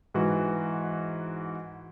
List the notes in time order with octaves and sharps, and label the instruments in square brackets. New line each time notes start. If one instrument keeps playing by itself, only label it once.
[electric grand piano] G#2 E3 F#4